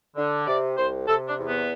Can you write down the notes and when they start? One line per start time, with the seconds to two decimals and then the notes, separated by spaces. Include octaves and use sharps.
0.16 D3
0.47 C3 D5
0.77 C2 C5
1.08 C3 A4
1.28 D4
1.39 E2
1.48 B3